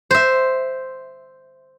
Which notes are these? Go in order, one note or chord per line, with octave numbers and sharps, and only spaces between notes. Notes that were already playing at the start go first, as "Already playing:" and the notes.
C5 E5